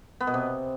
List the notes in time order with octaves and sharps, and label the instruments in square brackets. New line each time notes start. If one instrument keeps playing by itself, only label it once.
[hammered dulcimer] B3
B2
C3